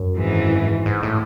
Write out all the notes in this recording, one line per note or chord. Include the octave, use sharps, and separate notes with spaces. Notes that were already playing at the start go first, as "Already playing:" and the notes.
Already playing: F#2
G#1 G#2 E3
G#2
A2